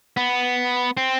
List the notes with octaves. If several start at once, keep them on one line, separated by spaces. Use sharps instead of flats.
B3
C4